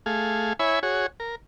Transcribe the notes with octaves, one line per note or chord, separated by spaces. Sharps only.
A3 G#4 F5
E4 C#5 E5 G#5 B5
F#4 G#4 C#5
A#4